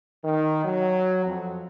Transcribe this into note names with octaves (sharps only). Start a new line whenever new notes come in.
D#3
F#3
F2